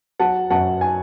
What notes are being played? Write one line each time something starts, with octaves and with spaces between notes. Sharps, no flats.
F#3 F#5 A5
F#2 F#5 A5
G#5